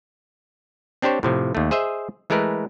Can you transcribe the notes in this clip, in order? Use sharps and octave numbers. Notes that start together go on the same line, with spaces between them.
C4 D4 G4 C5 C#5
A2 C3 F3
D#2 A3
G#4 C5 D#5 E5
E3 G#3 A3 A#4 B4